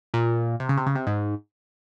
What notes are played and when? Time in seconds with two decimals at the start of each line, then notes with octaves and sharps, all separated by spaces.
0.14 A#2
0.60 C3
0.69 C#3
0.77 C3
0.86 C#3
0.95 C3
1.07 G#2